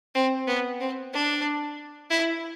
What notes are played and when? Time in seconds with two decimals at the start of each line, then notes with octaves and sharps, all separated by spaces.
0.15 C4
0.48 B3
0.80 C4
1.13 D4
2.10 E4